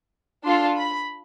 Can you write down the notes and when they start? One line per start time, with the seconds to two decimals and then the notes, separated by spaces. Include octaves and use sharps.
0.45 D4 F4 A4 C6
0.77 B5